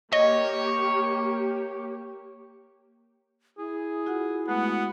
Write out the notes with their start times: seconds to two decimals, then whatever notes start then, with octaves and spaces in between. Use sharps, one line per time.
0.13 A#3 G4 C#5 D#5
3.58 E4 G#4
4.06 F4 F#4 F#5
4.48 G#3 A3 B3 F#4 F#5